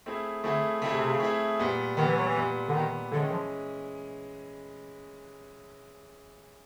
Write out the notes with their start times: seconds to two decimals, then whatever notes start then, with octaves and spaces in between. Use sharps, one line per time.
0.06 A3 C4 E4 G#4
0.44 D3 A3 C4 E4 G#4
0.82 C#3 A3 C4 E4 G#4
0.92 C3
1.02 C3
1.11 C#3
1.20 A3 C4 E4 G#4
1.59 A#2 G3 B3
1.97 A#2 D#3 G3 B3
2.06 E3
2.16 F#3
2.26 E3
2.36 A#2 G3 B3
2.68 D3
2.73 A#2 D#3 G3 B3
3.11 D3 E3 G#3 C#4
3.22 D#3
3.31 F3